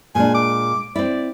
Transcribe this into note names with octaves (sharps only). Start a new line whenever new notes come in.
A#2 G#3 D4 G#5
D6
C4 E4 D5